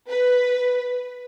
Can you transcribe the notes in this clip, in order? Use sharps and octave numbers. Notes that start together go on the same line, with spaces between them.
B4